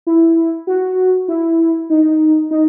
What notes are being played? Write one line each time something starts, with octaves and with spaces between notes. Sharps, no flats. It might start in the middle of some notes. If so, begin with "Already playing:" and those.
E4
F#4
E4
D#4
D#4